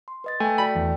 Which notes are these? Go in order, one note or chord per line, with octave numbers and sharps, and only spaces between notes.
C6
B4 D#5 A6
A3 G5 G#5
F#4 D5 G5 B5
E2